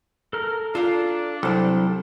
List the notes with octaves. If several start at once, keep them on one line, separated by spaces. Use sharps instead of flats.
A4 A#4 F6
D4 F4 A4 F5 A#5
C2 F#3 A4 C5